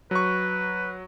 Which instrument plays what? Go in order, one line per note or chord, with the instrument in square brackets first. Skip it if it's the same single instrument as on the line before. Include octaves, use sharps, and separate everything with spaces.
[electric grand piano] F#3 C#6 [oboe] B4